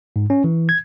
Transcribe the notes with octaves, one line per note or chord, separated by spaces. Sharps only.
G#2
C#4
E3
G#6